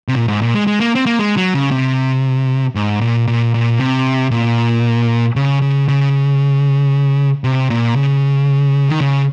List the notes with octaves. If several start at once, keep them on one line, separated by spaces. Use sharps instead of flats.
C3
A#2
G#2
A#2
G#3
G#3
A#3
C4
A#3
G#3
F#3
C#3
C3
G#2
A#2
A#2
A#2
C3
A#2
C#3
C#3
C#3
C3
A#2
C#3
D#3
C#3